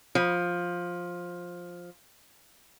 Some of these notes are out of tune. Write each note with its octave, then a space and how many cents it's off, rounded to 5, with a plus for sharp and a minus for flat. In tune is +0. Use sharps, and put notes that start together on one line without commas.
F3 +10